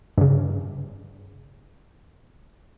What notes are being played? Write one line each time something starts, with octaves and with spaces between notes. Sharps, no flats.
G2 C#3